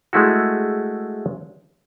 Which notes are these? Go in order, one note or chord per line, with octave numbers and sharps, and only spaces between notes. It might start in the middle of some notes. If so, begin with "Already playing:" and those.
G#3 A3 E4 F#4